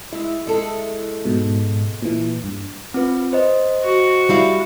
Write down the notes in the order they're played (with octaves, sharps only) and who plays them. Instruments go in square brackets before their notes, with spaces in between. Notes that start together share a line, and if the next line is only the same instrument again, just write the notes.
[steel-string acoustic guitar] G#3 [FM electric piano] E4 E5
[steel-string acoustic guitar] G#3 A4
[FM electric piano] G#2 B2
A#2 E3
G2
[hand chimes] C4 F4 B4
C5 D#5
[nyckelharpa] F#4
[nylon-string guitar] G3 E4 F5